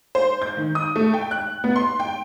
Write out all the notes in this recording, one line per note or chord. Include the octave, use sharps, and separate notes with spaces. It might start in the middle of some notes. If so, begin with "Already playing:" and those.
C5
G6
D#3
D#6
A3
G5
F#6
B3
C6
G5